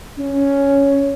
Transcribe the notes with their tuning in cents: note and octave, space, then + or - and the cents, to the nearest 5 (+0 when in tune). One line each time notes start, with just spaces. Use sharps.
C#4 +5